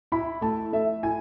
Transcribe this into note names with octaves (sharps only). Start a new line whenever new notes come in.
E4 B5
A3 A5
A3 E5
E4 G#5